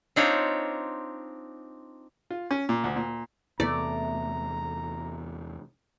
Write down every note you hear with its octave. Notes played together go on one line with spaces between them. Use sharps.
C4 D4 D#4 F4 C#5
F4
C#4
A#2
D2
A#2
E2 C3 A3 B3 D5 A#5